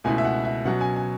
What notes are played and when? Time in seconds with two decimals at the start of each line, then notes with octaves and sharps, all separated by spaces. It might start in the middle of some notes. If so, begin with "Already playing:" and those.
0.04 C#2 B2 A3 E4 G#5
0.18 E5
0.25 F#5
0.45 E5
0.65 B2 F#3 C#4 F#5
0.81 G#5
0.96 G#5